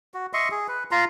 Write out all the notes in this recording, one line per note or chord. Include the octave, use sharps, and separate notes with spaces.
F#4
D#5 E5 C6 C#6
G#4
B4
F4 A#5 C6